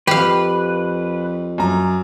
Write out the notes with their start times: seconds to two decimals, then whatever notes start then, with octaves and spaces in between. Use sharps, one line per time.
0.07 F2 G4 B4 F5
1.58 F#2 A#5